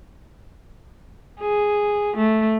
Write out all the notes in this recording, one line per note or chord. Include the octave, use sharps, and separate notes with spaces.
G#4
A3